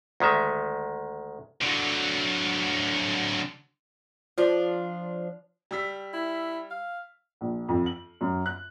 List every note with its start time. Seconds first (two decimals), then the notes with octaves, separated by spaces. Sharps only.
0.20 D2 D#3 G#3 E5
1.61 D3 F#3
4.38 F3 D4 F4
5.71 G3 E6 B6
6.13 E4
6.71 F5
7.41 A#1
7.68 F2
7.86 F#7
8.21 F#2
8.46 F#6